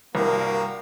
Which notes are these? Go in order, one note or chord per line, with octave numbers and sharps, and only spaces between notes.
C2 G2 G3 A#3 F#4 A#4